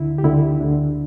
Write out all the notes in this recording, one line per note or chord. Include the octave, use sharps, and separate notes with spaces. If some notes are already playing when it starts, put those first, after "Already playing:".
Already playing: D2 D3 E4
G4
D2 D3 E4
D2 D3 D4